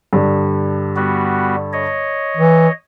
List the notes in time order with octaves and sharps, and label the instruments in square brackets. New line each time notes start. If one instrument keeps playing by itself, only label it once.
[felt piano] G2 D3
[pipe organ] G3 B3 F#4
C#5 D#5
[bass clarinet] E3